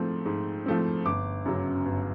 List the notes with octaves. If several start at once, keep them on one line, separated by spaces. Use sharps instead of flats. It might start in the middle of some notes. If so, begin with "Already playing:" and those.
Already playing: G#2 F3 A3 C4
G#2
F3 A3 C4
G1 D6
F#2 C#3 F#3
G1